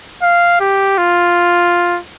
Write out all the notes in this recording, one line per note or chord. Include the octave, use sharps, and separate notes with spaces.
F5
G4
F4